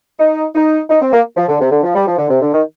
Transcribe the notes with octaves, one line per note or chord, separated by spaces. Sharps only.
D#4
D#4
D#4
C4
A#3
F3
D3
C3
D3
F3
G3
F3
D3
C3
D3
D#3